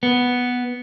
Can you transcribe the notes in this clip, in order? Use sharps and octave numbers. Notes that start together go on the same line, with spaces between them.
B3